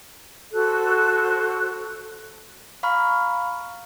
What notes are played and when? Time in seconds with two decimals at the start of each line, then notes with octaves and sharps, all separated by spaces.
0.52 F#4 A4 C5 F#6
2.83 F5 A#5 B5 C#6 F6